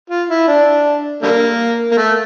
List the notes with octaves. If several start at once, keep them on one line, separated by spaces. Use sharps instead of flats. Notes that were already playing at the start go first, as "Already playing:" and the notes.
F4
E4
D4
D3 G3 A#3
A#3
A3